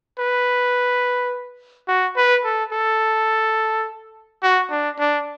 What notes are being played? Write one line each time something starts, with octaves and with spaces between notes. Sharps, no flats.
B4
F#4
B4
A4
A4
F#4
D4
D4